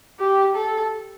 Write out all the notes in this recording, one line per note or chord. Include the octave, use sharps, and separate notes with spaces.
G4
A4